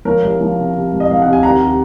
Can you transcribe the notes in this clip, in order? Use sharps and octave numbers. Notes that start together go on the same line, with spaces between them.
F3 A#4 C#5
C2
F3
C3
C3
C2
D#5
C2 F5
C3 F#5
G#5
D#2 F#5 A#5